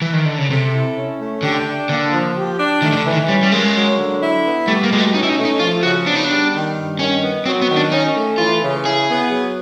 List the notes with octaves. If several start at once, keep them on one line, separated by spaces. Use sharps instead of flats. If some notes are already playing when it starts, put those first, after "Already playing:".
E3
D#3
D3
C#3
C3 A4
E4
C#4
A3
D3 G4
D4
D3 A#3
F3
G4
D4
D#3 A3
D#3
D3
E3
D#3
G3 C#4
G3
G#3 A#3
F#3
D3
E4
B3
G3 A3
A#3
B2 G#3
A3
C#4 D#4
E4
D#4
A3
D#4
F3 F4
C#3 F#4
B3 D4
D#4
D4
G3
D#3
G2
D#3 C#4
B3
F#3 C4
B3
D#3
D4
C#4 D#4
A3
E3 F4
C#3
E4 G#4
B3
F#3